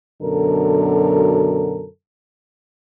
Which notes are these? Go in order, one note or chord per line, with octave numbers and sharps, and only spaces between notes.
F#2 B2 D3 A4 A#4